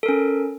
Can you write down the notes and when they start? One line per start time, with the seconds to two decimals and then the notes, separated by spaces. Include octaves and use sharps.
0.03 A4
0.06 A#4
0.09 C#4